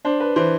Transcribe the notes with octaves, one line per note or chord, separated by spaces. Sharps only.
D4 C5
B4
E3 C5